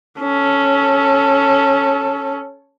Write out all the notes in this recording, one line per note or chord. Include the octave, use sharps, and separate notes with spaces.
C#4 A4